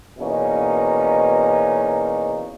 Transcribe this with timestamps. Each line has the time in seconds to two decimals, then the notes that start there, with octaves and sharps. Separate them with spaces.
0.18 E2 B2 A#3 C#4 D#4